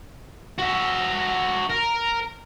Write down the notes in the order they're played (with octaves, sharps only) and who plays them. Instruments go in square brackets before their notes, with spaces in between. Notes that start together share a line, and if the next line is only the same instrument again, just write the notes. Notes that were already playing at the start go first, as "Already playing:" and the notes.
[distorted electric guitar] F#4 E5
A#4